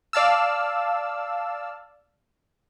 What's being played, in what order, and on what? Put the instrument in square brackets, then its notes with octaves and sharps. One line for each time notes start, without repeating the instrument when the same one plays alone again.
[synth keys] D5 F5 A5 E6